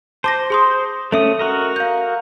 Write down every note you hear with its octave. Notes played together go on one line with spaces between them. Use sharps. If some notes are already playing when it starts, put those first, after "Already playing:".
C5 A5 D6 A#6
G#4 C6 D#6
A3 C#4 A4 E5 D#6
F#4 A#4 D#5
F5 G6